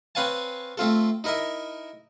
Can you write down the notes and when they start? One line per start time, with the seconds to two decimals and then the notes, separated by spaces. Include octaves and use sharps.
0.15 C4 B4 C#5 F5 G#5 A5
0.77 A3 C4 F4 A4
1.24 D#4 E4 A#4 D#5 E5